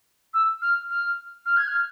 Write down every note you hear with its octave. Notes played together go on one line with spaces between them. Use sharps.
E6
F6
F6
F6
G#6
F6